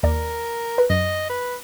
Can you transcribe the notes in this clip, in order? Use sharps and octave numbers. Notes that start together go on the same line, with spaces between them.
D#2 A#4 D5
B4
F#2 D#5
B4